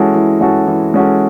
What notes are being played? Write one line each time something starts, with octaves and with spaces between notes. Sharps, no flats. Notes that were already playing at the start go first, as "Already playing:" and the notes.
Already playing: E3 G#3 C#4 F#4 A4
E3
G#3 C#4 F#4 A4
E3
G#3 C#4 F#4 A4